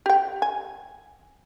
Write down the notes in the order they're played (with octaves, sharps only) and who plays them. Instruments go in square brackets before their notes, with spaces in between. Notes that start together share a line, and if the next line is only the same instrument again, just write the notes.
[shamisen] G4 G5
G#5